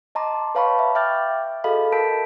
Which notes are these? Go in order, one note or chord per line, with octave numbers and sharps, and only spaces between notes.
D#5 A5 A#5 C6 D6
B4 C#5 F5 A5 B5 C#6
E5
E5 G5 D6 F6 G6 A6
F#4 G#4 A4 D#5 F5 B5
A#4 A5 G6 B6 D7